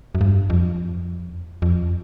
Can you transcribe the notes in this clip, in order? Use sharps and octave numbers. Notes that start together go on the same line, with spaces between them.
F#2
G2
F2
F2